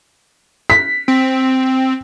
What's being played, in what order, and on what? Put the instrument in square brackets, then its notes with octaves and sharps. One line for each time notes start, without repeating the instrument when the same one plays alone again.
[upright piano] B6
[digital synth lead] C4